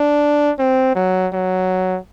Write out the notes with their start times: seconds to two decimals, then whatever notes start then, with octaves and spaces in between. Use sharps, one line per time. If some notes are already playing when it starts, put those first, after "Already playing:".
Already playing: D4
0.59 C4
0.95 F#3
1.33 F#3